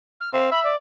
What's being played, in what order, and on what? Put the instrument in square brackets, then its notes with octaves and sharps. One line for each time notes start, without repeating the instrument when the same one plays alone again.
[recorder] F6
[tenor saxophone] C4 [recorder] F5
[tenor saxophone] E5 [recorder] B5
[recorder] D5